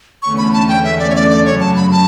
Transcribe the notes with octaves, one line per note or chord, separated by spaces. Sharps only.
E2 D3 A3 C#4 C#6
B5
A5
G5
E5
D5
C#5
D5
D5
F#2 C#3 F#3 C#5
A5
B5
A5